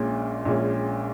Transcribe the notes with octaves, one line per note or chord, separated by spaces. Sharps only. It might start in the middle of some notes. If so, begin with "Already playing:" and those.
Already playing: A#1 A#2 G#3 C#4
A#1 A#2 G#3 C#4